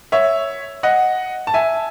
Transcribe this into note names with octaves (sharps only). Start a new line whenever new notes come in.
C#5 E5
D#5 F#5
A5
E5 G#5